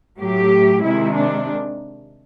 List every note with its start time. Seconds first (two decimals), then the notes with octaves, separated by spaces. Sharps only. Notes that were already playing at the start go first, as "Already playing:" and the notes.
0.19 A2 F#3 G4
0.84 C3 D#3 G#3 E4
1.15 D4